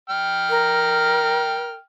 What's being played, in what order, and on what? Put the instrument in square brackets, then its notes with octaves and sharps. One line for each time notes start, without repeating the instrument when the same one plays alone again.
[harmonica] G5 F6
[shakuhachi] A#4